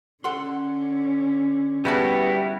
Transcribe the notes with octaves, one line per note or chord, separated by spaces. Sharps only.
D3 C#4 A4 F#5 C6
G3 B3 E4 F#4 G#4 A5